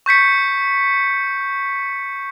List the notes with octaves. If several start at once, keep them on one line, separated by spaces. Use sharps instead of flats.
C#6 G6 B6 C#7